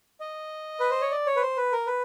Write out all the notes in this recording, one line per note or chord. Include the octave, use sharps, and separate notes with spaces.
D#5
B4
C5
C#5
D5
C#5
B4
C5
B4
A#4
B4